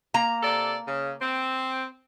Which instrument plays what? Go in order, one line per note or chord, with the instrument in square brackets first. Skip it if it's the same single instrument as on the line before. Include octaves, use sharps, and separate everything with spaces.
[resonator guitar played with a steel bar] A#3 A#5
[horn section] C3 A4 D5
C#3
C4